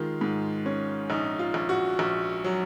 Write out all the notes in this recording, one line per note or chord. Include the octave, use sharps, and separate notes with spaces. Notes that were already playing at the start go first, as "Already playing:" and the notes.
Already playing: D#3 G#3 F4
G#2
C#4
A#1 D#4
F4
A#1
F#4
A#1
F#3